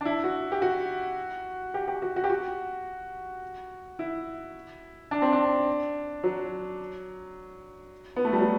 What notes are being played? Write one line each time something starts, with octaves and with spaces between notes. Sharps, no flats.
D4
E4
F#4
G4
F#4
G4
G4
F#4
F#4
G4
F#4
E4
D4
C4
D4
F#3
B3
A3
G3
F#3